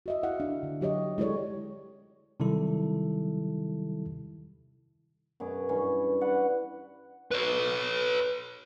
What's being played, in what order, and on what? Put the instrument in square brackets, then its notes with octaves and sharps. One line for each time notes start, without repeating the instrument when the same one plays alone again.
[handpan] F#4 D#5 E5
E4 F5 F#5
D4
D3
F#3 G4 C#5 D#5
G#3 E4 G4 A4 C#5 D5
[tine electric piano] C3 D#3 F#3 G3 E4 A4
[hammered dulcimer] F#2 B2 G#4 D6
G2 E3 C#4
B4 D5 F#5
[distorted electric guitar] B4 C#5